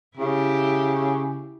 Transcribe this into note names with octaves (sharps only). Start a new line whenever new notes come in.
C#3 E4 G4